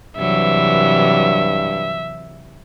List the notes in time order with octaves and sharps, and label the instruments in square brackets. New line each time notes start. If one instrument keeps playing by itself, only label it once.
[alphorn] G2 [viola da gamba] C3 E3 F#3 [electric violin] E5